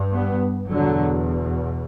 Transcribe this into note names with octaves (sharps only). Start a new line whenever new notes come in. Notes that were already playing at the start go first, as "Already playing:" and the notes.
Already playing: G2
G3 B3
E2 B2 D3 F#3